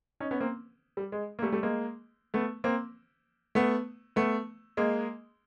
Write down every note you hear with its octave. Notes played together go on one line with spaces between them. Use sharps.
C#4 D#4
B3 C#4
A#3 C4
G3
G#3
A#3
G3 A3
G3 A3
G#3 A#3
A3 B3
A#3 C4
A3 B3
A3 B3
G#3 A#3